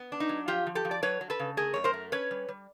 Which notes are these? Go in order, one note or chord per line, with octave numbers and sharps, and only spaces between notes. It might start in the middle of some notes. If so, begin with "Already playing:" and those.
Already playing: B3
D4
D#4
F#3
F3 F4 G4
F3
G4 A4
F3
D5
F#3 B4 C#5
F#3
A4 B4
C#3
A3 G#4 A#4
F#2 C#5
A#4 C5
A3
C#4 B4 C#5
G3
G3